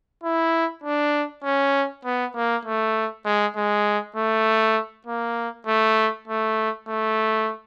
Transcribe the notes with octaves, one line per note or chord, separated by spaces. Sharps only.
E4
D4
C#4
B3
A#3
A3
G#3
G#3
A3
A#3
A3
A3
A3